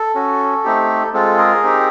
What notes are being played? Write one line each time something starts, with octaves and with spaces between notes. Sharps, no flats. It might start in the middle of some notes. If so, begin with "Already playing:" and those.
Already playing: A4
C#4 F#4
A3 C4 D#4 G4
G#3 C4 F4 A4
G#4 A#4
C4 D#4 G4